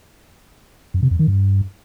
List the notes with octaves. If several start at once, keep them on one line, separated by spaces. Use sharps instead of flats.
F#2
C3
F2
D#3
G2